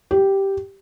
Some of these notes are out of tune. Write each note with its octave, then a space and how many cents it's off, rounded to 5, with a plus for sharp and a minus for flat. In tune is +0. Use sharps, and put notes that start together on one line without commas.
G4 -5